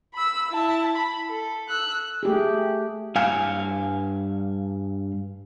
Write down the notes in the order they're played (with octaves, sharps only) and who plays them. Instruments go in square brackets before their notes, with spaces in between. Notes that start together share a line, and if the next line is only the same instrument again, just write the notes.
[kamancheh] B5 E6
E4 A5
B5
A4
E6 F#6
[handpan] A3 G4 G#4
[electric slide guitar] G2 F5 G#5